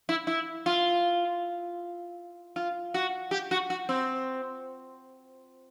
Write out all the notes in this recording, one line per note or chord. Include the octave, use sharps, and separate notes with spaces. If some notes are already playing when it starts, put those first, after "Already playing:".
E4
E4
F4
F4
F#4
G4
F#4
F#4
C4